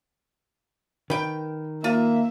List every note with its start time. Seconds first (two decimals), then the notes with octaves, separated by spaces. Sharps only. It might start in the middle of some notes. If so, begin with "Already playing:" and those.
1.10 D#3 B4 G5
1.84 A#3 F4 E5